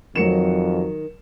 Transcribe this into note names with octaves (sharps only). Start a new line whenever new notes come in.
F2 D#3 F#3 C#7 E7